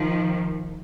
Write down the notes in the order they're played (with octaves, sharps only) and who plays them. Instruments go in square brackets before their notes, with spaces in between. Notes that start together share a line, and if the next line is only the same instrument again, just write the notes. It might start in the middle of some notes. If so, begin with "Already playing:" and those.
Already playing: [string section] D#3 F3